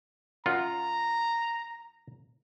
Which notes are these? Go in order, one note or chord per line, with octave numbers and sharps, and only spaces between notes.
F#2 F4 F#5 A#5